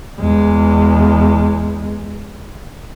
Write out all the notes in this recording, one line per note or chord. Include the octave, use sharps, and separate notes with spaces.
E2 G#3